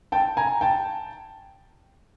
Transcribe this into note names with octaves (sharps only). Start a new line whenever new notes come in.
G5 A5
G#5 A#5
G5 A5